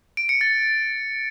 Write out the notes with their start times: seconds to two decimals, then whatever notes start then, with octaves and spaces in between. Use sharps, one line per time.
0.17 D7
0.29 C#7
0.41 A6